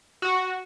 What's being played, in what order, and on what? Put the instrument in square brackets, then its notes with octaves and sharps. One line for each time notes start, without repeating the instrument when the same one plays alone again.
[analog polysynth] F#4